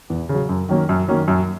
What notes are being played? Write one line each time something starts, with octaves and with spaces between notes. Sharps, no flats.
E2
C#3
F#3
F#2
D#3 F#3 A#3 C#4
F#2
D#3 F#3 A#3 C#4
F#2